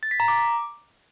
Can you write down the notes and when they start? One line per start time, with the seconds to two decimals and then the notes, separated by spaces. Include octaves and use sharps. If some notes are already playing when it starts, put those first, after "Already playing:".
0.03 A6
0.11 B6
0.20 A#5
0.28 D6